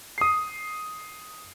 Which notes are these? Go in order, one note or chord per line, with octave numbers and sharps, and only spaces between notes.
D#6 C7